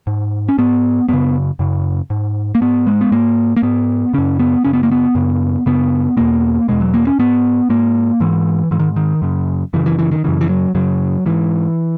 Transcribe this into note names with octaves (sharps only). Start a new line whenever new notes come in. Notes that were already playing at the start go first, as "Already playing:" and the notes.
G#2
C#4
G#2 B3
F#2 C#3 B3
F#2 C#3
G#2
A#3
G#2 B3
G#3
B3
G#2 A#3
A#3
G#2 B3
F#2 C#3 C#4
B3
F#2 C#3 C#4
B3
A#3
B3
F#2 C#3
F#2 C#3 B3
E2 B2 A#3
E2 B2 G#3
F#3
A#3
C#4
G#2 B3
G#2 A#3
G#2 E3
G#2 E3
D#3
D#3
F#2 C#3
F#2 C#3 E3
E3
E3
D#3
F#2 C#3 E3
E3
F#3
F#2 C#3 F#3
G#2 E3